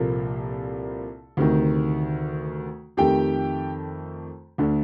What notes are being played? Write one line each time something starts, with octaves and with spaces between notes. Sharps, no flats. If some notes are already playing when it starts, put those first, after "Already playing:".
Already playing: C2 A#2 F3 A#3 A4
D2 C3 D#3
F2 D#3 A3 G4 G5
D2 D3 A3